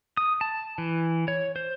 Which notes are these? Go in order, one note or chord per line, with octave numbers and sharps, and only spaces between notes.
D#6
A5
E3
C#5
C5